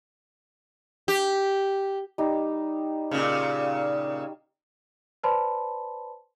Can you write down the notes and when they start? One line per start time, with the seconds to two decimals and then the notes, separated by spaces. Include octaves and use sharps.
1.08 G4
2.18 G3 D#4
3.11 A#2 C#3
5.23 B4 C5 D5 A5 B5 C6